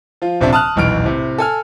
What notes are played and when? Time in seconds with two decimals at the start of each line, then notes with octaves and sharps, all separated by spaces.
0.22 F3 F4
0.41 D#1 C3 F3 C4 D4 E5
0.53 A5 D#6 F6 F#6
0.76 D#1 B1 E2 F6 D7
1.04 A2 C3
1.38 A4 G#5 F6